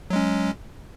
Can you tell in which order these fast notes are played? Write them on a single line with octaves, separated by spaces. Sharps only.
F#3 G#3 C#4